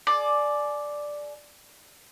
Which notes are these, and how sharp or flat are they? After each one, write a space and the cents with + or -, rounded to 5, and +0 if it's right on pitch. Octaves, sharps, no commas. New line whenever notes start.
G#4 +35 D5 +0